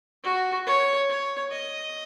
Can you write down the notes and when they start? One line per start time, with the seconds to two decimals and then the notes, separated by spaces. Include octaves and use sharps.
0.24 F#4
0.66 C#5
1.09 C#5
1.51 D#5